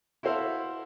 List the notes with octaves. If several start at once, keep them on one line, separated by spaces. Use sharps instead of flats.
E4 F#4 A4 C5 E5 F5